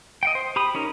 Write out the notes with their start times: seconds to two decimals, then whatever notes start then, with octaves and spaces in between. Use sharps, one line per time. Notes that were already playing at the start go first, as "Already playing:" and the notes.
0.23 D#5 F#5 G5
0.35 C5
0.56 G4 B5 D#6
0.75 C#4 D#4 A#4